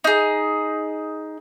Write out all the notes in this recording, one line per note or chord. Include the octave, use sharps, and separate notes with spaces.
D#4 G#4